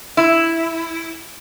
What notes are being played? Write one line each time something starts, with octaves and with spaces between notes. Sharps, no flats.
E4